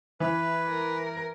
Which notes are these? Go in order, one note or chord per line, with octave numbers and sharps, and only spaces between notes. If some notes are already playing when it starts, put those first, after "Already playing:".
E3 B4
A#4